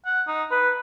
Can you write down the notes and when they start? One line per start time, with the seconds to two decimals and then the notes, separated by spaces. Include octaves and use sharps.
0.06 F#5
0.27 D#4
0.51 B4